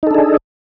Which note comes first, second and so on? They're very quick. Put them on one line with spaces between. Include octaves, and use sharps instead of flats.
D#4 A4 D4 G#4